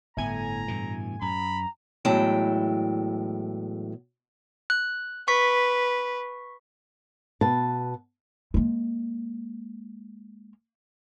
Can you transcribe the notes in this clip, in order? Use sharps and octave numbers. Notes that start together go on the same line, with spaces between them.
G1 A2 B3 G#5 A#5
G2 B2 E3
F#2 A#5 B5
E2 A2 F#3 G#3 E4 G5
F#6
B4 C#6 B6
B2 B4 A5
G#3 A#3